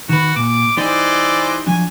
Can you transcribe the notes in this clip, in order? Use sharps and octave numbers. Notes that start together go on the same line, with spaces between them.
D#3 F#4 B4
A#2 D6
E3 G3 D#4 C5 D5 D#5 G5
F3 F#3 D4 G#5